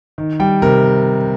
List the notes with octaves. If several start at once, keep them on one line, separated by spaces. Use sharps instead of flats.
D#3
G3 G5
C3 A#4